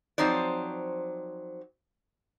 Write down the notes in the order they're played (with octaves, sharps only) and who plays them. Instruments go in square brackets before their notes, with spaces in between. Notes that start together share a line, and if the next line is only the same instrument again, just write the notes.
[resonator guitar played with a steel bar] F3 F#3 C4 D#4 C5 D5